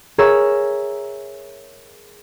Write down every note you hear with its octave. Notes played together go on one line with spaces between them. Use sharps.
G#4 A#4 C#5 E5 A#5 E6